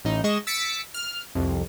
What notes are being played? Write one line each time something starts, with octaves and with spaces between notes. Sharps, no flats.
A1 D#4
G#3 D#5 C#6 E7
E6 A6 B6 C#7 D7
F6
C2 F2